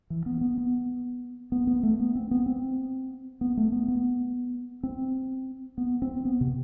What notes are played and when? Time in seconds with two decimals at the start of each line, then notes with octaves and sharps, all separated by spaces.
0.10 E3
0.26 B3
0.41 B3
0.58 B3
1.52 B3
1.67 B3
1.83 A3
2.00 B3
2.15 C4
2.31 B3
2.46 C4
3.41 B3
3.57 A3
3.72 B3
3.88 B3
4.83 C4
5.78 B3
6.02 C4
6.25 B3
6.41 C3